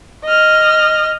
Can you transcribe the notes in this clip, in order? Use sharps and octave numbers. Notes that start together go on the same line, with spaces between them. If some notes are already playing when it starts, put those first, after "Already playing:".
D#5 F6